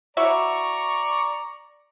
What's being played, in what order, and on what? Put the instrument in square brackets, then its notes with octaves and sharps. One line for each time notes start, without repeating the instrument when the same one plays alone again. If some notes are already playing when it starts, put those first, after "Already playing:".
[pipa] E4 F#4 E5 [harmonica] D5 A#5 [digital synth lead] C#6